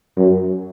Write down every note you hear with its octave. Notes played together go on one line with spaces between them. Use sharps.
F#2